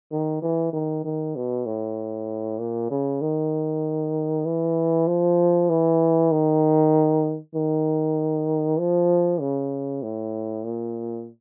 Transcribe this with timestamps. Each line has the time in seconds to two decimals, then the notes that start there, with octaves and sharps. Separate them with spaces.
0.12 D#3
0.42 E3
0.73 D#3
1.04 D#3
1.36 B2
1.66 A2
2.59 A#2
2.91 C#3
3.21 D#3
4.45 E3
5.07 F3
5.69 E3
6.31 D#3
7.55 D#3
8.79 F3
9.40 C#3
10.03 A2
10.64 A#2